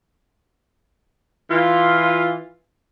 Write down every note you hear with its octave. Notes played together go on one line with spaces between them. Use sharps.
E3 F4